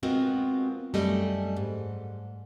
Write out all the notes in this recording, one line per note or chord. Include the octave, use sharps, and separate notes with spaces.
G#3 B3 C4 F4 F#4 A#4
F#2 G3 A3 A4 D#5 G#5
G#2